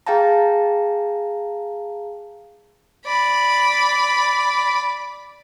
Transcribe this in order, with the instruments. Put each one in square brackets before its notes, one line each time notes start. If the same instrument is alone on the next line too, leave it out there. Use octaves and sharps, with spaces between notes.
[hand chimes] G#4 F5 G5 A5 A#5
[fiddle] D5 B5